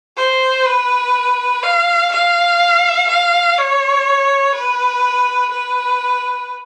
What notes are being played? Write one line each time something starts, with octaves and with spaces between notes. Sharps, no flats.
C5
B4
F5
F5
F5
C#5
B4
B4